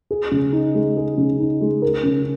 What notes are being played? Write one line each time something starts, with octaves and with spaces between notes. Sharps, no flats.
G#4
C#3
D#4
G#3
G#4
C#3
D#4
G#3
A#4
C#3